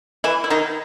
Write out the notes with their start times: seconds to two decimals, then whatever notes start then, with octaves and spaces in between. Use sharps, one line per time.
0.24 E3 E4
0.44 E4
0.50 D#3 D#4